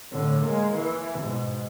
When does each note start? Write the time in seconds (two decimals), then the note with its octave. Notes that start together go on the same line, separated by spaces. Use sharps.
0.11 A2 D3
0.42 G#3 A#3
0.74 E3
1.20 G#2 B2